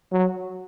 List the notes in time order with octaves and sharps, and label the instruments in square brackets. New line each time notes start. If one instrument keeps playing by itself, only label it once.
[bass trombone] F#3